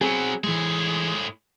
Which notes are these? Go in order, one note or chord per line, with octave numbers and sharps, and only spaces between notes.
F#3 B3 C4 G#4
A2 E3 G#3 G#4